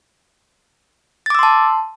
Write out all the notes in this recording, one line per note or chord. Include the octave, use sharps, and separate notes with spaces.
A5 C6 D6 E6 A6